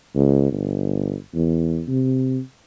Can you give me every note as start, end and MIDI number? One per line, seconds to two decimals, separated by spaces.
0.15 0.51 37
0.52 1.15 31
1.34 1.83 40
1.88 2.40 48